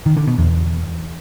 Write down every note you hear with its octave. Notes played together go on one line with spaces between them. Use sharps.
D#3
D3
B2
E2